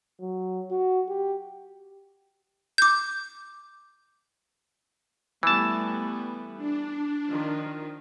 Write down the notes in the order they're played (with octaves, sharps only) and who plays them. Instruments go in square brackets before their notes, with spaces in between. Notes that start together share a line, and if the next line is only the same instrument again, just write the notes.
[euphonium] F#3
F#4
G4
[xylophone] D6 G6
[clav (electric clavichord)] E3 A5 [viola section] G3 A3 B3
[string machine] D4
[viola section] D#3 F3 F4